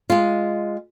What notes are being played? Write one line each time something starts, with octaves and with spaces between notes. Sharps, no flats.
G#3 F4